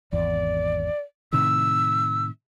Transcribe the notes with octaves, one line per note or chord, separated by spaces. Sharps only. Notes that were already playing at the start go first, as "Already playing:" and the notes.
G#1 E2 D5
A2 C3 D#3 E6